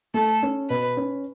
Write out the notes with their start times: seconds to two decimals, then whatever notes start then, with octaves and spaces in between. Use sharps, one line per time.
0.14 A3 A4
0.43 C#4
0.69 B2 B4
0.97 C#4